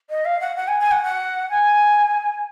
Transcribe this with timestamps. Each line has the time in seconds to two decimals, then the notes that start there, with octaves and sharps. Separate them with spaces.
0.10 D#5
0.25 F5
0.41 F#5
0.56 F#5
0.68 G#5
0.80 G#5
0.91 F#5
1.03 F#5
1.50 G#5